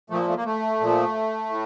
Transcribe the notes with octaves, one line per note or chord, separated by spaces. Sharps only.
A#2 F3 A3
A#3
A3
A#3
A3
A#2 F3
A2